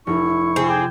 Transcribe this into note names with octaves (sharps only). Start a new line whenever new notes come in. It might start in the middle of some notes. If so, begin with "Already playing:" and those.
F1 E4 C#6
C3 C4 G#4
G5 D6 G#6 E7